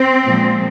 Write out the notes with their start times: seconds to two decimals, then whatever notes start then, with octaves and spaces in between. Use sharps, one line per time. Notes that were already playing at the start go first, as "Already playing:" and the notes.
Already playing: C4
0.26 A#2 F3 G#3